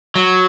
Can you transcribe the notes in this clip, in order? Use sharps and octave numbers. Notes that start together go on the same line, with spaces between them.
F#3